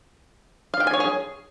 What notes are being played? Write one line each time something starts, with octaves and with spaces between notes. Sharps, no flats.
F5
G5
G#5
C#5
G#4